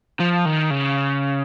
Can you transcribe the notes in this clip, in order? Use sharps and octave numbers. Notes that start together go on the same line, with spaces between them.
F3
D#3
C#3